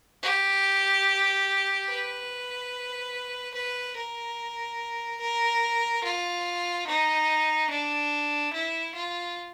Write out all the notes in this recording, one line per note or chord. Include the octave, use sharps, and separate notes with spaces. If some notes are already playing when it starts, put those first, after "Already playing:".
G4
B4
B4
A#4
A#4
F4
D#4
D4
E4
F4